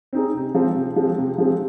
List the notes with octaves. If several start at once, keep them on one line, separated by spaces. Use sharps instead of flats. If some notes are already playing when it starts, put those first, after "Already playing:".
C4 D#4 G#4
C3
F3 G#3 C4
C3
F3 G#3 C4
C3
F3 G#3 C4